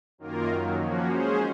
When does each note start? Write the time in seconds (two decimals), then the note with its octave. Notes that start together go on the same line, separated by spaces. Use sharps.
0.18 F#2 D#3 A#3 F4 A#4
0.47 F#2 D#3 F#3
0.78 F3 A#3 C#4 F#4
1.07 G#3 C#4 G#4 C5